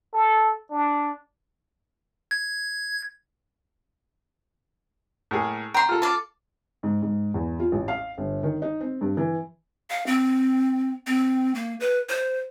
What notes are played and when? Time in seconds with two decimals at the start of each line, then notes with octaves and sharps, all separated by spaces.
0.14 A4
0.71 D4
2.31 G#6
5.31 A2 A#3 G#4
5.74 G5 A#5 C6
5.89 F4 A4
6.02 D5 A5
6.83 G#2
7.02 G#2
7.34 E2
7.60 F4
7.72 A1
7.88 F5
8.18 G1
8.43 D#3
8.62 D#4
8.81 C4
9.01 G2
9.17 E3
9.90 F5
10.06 C4
11.07 C4
11.55 A#3
11.80 B4
12.09 C5